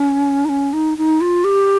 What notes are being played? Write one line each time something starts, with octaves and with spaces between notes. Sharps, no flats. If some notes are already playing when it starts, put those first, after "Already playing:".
Already playing: C#4
D#4
C#4
D#4
D#4
F4
G4